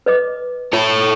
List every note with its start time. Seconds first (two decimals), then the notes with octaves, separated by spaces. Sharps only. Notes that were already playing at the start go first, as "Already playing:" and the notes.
0.06 B4 D#5 D6
0.73 F4 A4 C#5